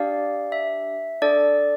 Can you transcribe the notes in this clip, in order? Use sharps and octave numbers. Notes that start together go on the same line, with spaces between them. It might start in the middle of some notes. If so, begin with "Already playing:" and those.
Already playing: D4 G4 D5 F5
E5
D4 A4 D5